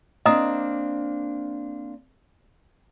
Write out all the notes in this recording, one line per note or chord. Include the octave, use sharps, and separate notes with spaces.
A#3 C4 D4 D#5 A#5 D#6